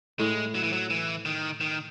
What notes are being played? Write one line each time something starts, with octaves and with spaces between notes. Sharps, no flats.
A2 G#3
F#3
E3
F#3
E3
D#3
D#3